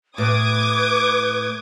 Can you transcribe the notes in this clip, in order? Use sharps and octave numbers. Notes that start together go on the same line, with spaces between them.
A2 B4 D6 D#6 G#6